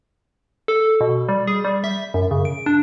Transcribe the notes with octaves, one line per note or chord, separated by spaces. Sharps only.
A4
B2
G3
G#4
G3
E5
F#2
C#3
D7
D4